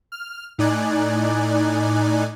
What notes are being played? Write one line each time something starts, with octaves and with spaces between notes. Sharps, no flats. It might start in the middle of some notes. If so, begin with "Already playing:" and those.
F6
A2 D#4 D5 G#5 F#6